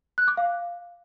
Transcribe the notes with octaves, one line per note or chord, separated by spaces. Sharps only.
F#6
D6
F5